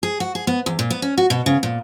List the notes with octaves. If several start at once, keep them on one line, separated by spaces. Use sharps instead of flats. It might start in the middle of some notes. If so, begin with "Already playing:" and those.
G#4
F#4
G#4
B3
E2
A#2
B3
C#4
F#4
B2
C#3
A#2